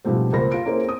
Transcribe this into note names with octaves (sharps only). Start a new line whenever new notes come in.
G#2 B2 F3 G3 A3 C4
C#2 A#3 A#4 C5 B5 A#6
F4 D7
A#3 C#4 E4 G#4 A#4 C5
C4 D#6